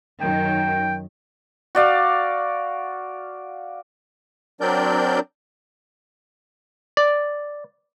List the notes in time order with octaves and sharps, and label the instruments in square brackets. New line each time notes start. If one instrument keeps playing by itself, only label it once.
[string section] F#2 D#3 F#3 [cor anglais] G5
[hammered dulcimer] F#4 D5 F5
[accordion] F#3 C4 D4 A#4 D5 G6
[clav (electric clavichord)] D5